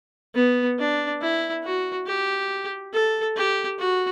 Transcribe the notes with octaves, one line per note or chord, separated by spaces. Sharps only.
B3
D4
E4
F#4
G4
A4
G4
F#4